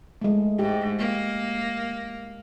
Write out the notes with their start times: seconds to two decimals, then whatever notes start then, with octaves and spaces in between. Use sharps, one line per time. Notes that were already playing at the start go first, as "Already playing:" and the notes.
0.21 G#3 A3
0.59 G#2 G4
0.99 A#3